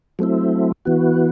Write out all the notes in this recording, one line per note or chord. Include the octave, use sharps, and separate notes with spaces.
F#3 A3 C4 E4
E3 B3 F#4